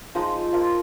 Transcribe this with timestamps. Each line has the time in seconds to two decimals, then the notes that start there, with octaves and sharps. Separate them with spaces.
0.15 F3 G#3 D#4 C5 D#5
0.52 F3 A#3 F4